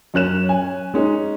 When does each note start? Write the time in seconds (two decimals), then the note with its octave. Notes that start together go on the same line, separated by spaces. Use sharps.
0.14 F#2 C#4 F#6 E7
0.49 G#5
0.94 G#3 C#4 D#4